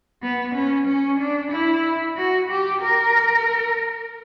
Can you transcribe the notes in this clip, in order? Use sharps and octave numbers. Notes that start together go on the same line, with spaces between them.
B3
C#4
C#4
D4
E4
F#4
G4
A#4